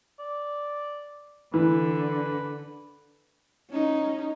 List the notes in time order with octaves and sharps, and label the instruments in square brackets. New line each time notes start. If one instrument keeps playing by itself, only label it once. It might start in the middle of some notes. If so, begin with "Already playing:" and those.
[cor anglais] D5
[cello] D3 [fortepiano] E3 [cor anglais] B4
[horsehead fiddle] C#4 D#4